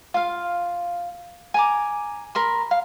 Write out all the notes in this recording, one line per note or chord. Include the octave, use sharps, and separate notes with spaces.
F4 F5
G#5 A#5 D6
A#4 B5 C6
F5